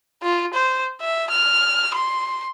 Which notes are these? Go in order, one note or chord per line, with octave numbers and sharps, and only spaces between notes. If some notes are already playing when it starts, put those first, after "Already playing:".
F4
C5
E5
F6
C6